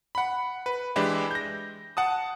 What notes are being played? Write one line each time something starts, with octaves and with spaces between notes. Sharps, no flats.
F#5 B5
B4
E3 G#3 D4 E4 G4
G6 A#6
F#5 A5 D#6